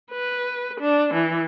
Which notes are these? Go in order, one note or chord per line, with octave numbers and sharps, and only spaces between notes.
B4
D4
E3